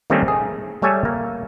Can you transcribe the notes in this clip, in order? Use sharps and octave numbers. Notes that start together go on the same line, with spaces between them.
D#3 G3 A3 A#3 C4 C#4
G#4
G3 A3 C#5 E5 G#5 A5
A#3